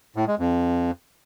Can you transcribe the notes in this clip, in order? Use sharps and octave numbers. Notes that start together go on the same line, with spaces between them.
A2
G#3
F2